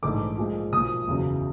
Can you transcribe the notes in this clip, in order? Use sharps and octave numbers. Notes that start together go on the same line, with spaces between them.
A#1 G#2 E3 A3 D6
A#2 F3 G#3
B1 A#2 F3 D#6
F#1 E2 C#3 F#3